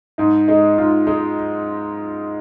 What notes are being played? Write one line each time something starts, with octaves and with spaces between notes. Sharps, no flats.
G#2 D#4
G#3 D#4
G#2 F4
G#3 D#4